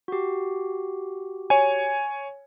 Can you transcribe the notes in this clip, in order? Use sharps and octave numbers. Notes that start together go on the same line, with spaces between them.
F#4 G4
C#5 G#5